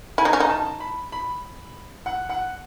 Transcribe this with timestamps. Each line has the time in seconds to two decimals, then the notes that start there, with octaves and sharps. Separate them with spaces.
0.18 E4 G#5
0.25 D#4
0.33 C#4
0.40 D#4
0.50 A5
0.80 B5
1.12 B5
2.06 F#5
2.29 F#5